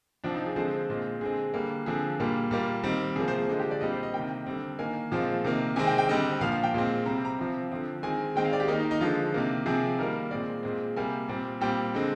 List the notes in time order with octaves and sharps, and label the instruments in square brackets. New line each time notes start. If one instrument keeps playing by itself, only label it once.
[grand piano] C3 F3 C4 D4
D#4
G#4
D3 F3 G#3 C4 C5
A#2 G#3 C4
D3 G#3 C4 G#4
D3 G3 A#3
D3 F3 C4 G#4
A#2 G3 A#3
A#2 G3 A#3
D#3 G3 C4
C3 F3 A#3 G#4
C5
G#4
D3 F3 G#3
G4
D5
A#2 G3 C4 D#5
C5
D#5
C3 D#3 A#3 G5
D3 G3 C4
D#3 A#3 G#5
A#2 F3 G#3 C4
C3 D#3 A#3
C3 D#3 G#3 C4 G#5
G5
G5
D3 G3 C4 D#5
A#2 F3 A#3 F5
F5
G5
A#2 G#3 C4
C3 G3 C4 A#5
A#5
C3 F3 C4
D3 F3 C4
D#3 G#3 C4 G#5
D#3 G#3 C4 G5
F5
D5
G4
D#3 A#3 D#4
D#4
D#4
D3 F3 G#3 F4
C3 D#3 A#3
C3 F3 C4 G#4
D#3 G3 A#3 A#4
A#2 G#3 C4 D5
A#2 G#3 C4
C3 G3 A#3 G#5
A#2 G3 C4
A#2 G3 C4 G5
D3 G#3 C4